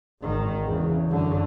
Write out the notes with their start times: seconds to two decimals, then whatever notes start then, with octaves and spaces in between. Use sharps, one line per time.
0.22 G#1 D#3
0.66 E2 C#3
1.09 F#2 D3